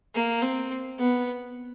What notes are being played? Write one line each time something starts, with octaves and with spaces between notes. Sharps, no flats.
A#3
C4
B3